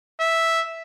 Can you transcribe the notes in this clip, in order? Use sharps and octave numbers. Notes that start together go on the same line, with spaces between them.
E5